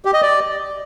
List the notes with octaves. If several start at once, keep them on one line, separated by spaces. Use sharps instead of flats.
G4
D#5
D5